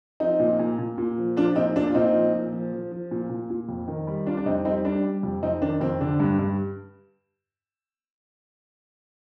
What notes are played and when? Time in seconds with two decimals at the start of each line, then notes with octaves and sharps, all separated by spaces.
0.20 F3 C4 D#4
0.39 A#2
0.59 A#2
0.78 A#2
0.98 A#2
1.18 F3
1.37 F3 D4 F4
1.55 A#2 C4 D#4
1.76 A#2 D4
1.87 F4
1.94 A#2 C4 D#4
2.14 F3
2.33 A#2
2.52 F3
2.73 F3
2.91 F3
3.11 A#2
3.29 A#2
3.50 A#2
3.69 F2
3.88 D#3
4.07 G3
4.26 G3 D4 F4
4.37 D4
4.46 F2 C4 D#4
4.65 G3 C4 D#4
4.85 G3 D4
5.04 G3
5.23 F2
5.43 F2 C4 D#4
5.61 D#3 D4
5.81 F2 C4
6.00 D3 D4
6.20 G2
6.39 G2